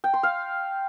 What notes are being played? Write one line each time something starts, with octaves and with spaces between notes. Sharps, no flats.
G5
C6
F5